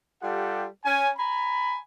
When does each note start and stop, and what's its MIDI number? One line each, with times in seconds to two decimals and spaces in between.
0.21 0.65 55
0.21 0.65 65
0.21 0.65 67
0.21 0.65 69
0.21 0.65 78
0.84 1.10 61
0.84 1.10 80
1.17 1.78 80
1.17 1.78 82
1.17 1.78 83